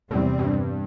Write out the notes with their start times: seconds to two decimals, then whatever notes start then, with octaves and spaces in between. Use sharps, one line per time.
0.10 E2 A2 C3 G3 C4
0.39 G2